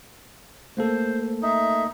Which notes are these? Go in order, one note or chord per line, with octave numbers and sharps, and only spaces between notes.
A3 A#3 A4 C5
D#4 E5